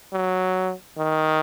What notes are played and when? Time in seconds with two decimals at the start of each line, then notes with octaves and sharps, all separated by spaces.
0.13 F#3
0.98 D#3